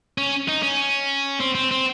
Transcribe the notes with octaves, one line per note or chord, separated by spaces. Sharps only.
C#4
D#4
C#4
C4
C4
C4